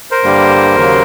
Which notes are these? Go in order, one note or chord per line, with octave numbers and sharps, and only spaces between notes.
A#4 C5
G2 D3 G3 A#3
D#2 C#3 F#3 A#3